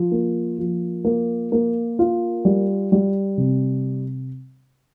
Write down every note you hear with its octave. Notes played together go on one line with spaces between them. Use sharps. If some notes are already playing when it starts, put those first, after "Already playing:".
Already playing: F3
A#3
F3
A#3
A#3
F4
G3
G3
C3